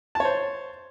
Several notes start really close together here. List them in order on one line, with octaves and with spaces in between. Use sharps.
A5 C#5 C5